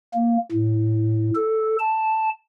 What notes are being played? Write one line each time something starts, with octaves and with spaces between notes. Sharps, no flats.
A#3
A2
A4
A5